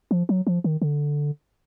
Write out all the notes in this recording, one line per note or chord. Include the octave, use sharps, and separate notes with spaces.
F3
F#3
F3
D#3
D3